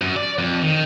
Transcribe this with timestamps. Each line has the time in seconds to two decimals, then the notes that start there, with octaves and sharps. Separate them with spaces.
0.01 F#2
0.16 D5
0.38 F2
0.62 D#3